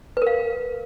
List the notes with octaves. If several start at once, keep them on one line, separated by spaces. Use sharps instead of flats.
A#4 B4 F5